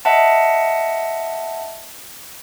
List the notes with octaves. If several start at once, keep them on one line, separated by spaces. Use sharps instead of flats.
D#5 E5 F#5 A5